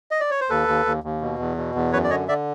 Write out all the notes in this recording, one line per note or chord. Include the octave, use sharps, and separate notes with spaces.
D#5
D5
C#5
C5
D#2 A4 B4
D#2
D#2
D#2
B2
E2
B2
E2
F#2 B4 C#5
D5
D3 C#5 D#5
D3 D5 E5